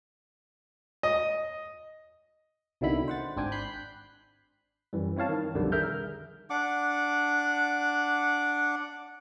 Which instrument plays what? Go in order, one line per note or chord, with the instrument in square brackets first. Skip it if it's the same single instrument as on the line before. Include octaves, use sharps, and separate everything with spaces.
[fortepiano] D#5
[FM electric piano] C2 B2 D3 D#3 E4 B5
C5 F#5 A6
G#1 C4 D4 G5 G#5
B5 F#6 G6 B6 C7
[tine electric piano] F#2 E3 G3
C4 E4 C#5 F5 A5
D#3
B1 F2 D3 D#3 G3
G#4 A#4 E5 A#5 F6 G6
[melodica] D4 F#5 D6